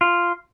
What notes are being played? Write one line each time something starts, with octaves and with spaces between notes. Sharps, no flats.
F4